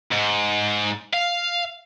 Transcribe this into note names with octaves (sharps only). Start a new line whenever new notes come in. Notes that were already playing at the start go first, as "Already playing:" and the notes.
G#2
F5